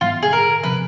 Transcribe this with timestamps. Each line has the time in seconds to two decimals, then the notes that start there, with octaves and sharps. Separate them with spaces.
0.01 G#2 E3 G3 B3 F4
0.23 G#4
0.33 A#4
0.63 C3 F3 B4